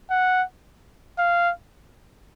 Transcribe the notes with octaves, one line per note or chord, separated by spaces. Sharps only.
F#5
F5